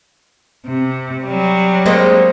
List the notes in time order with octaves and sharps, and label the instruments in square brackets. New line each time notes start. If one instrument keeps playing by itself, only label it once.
[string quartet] C3
F#3 G3
[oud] G#3 A#3 C4